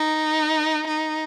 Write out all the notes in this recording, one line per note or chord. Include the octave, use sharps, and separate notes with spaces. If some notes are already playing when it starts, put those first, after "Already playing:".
Already playing: D#4
D#4